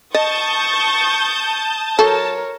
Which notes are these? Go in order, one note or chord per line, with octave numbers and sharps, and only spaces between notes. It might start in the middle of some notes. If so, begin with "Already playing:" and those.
D#5 A5 C#6 D#6 G6 A6
F#3 A4 A#4 C#5